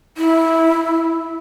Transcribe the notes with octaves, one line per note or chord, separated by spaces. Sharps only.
E4